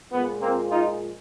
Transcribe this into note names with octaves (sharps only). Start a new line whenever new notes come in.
A#2 F3 G#3 B3
A#3 C4
D#4 F4